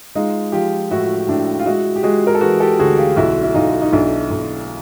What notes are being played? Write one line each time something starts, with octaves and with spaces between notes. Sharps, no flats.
G#3 D#4 F4
F3 F4 G4
A2 E4 F#4
A2 D4 E4
F4
G#3 E4 F#4
G4
G#3 F#4 G#4
A#4
A4
E3 F#4 G#4
G4 A4
D2 F#4 G#4
F4 G4
B1 E4 F#4
E4
B1 D#4 F4
D#4
B1 D4 E4
B1